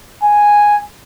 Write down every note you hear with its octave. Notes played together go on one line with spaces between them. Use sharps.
G#5